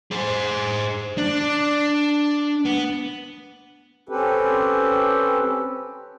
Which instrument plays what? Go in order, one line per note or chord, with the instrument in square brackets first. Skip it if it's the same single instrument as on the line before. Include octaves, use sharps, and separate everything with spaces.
[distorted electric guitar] G#4 C5
D4
B3
[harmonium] C4 C#4 G4 A4 B4